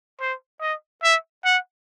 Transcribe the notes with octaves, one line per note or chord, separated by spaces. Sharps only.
C5
D#5
E5
F#5